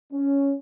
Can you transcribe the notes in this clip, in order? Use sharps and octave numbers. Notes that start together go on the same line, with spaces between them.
C#4